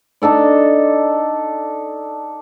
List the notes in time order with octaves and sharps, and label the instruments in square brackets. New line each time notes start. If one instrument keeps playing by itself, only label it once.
[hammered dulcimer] D4 D#4 A4 D5